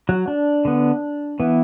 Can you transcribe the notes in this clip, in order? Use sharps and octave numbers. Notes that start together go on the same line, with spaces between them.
F#3 F#4
D4
D3 B3
E3 B3